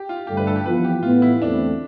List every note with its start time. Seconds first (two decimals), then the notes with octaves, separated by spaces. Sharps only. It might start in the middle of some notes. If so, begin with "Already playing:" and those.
Already playing: G4
0.09 F4
0.27 G2 D3 A3 D4 G4
0.37 B4
0.47 A4
0.56 G4
0.65 F2 E3 B3 F4 B4
0.84 G4
1.03 A2 E3 B3 F4
1.22 E4
1.41 E2 D3 A3 C4 D4